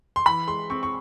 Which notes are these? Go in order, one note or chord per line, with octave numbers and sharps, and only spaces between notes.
C6
E3 B5
G#3 C6
C4 C#6
C#6